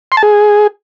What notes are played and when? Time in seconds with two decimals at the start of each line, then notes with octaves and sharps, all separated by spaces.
0.12 C6
0.17 A5
0.23 G#4